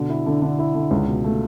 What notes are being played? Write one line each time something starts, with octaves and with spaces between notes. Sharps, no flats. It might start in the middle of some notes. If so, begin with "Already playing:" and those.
Already playing: B2 D3
E4
D3
D3
E4
D3
C#2
B2
A3